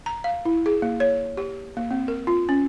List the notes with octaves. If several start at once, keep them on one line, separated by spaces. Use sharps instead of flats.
A#5
F5
E4
G#4
A#3
C#5
G4
A#3
C4
A#4
F4
C#4